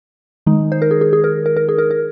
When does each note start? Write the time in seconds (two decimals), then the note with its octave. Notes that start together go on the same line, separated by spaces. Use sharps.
0.47 D#3 G#3 D#4
0.72 C5
0.82 A#4
0.91 G#4
1.01 G#4
1.13 G#4
1.24 A#4
1.46 A#4
1.57 A#4
1.69 G#4
1.78 A#4
1.91 A#4